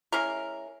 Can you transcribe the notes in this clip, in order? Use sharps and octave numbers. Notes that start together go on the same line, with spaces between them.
G#3 C#4 E4 A#4